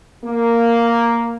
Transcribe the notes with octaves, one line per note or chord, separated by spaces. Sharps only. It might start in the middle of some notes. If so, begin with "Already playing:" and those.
A#3